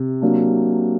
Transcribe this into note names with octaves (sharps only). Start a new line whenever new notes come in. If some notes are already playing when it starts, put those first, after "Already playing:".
Already playing: C3
F#3 A#3 D4